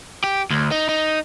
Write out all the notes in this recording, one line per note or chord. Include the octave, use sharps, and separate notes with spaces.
G4
D2
D#4
D#4